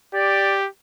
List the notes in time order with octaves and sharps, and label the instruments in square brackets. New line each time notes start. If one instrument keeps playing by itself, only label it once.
[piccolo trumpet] G4 [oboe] D5